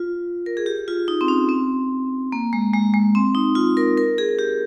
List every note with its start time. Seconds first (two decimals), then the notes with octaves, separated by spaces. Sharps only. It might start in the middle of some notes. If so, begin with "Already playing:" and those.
Already playing: F4
0.46 A#4
0.57 G#4
0.66 G4
0.88 F4
1.08 D#4
1.21 C4
1.28 C#4
1.49 C4
2.32 A#3
2.53 G#3
2.74 G#3
2.94 G#3
3.15 C4
3.35 D#4
3.55 F4
3.77 A#4
3.98 A#4
4.18 G#4
4.39 G4